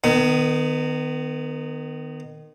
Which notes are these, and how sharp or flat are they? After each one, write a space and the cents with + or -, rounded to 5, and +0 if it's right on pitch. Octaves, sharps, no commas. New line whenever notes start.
D#3 -25 B3 +20